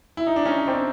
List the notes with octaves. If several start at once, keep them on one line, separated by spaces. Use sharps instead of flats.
E4
D#4
D4
C#4 D#4
C4 D4